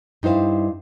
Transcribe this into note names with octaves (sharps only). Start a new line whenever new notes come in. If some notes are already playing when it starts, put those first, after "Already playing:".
G2 D#4 E4 C5 F5